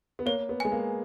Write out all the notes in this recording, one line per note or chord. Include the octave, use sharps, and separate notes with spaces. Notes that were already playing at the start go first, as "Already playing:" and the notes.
B3
A#3 C#5
B3
G#3 G#5
A#3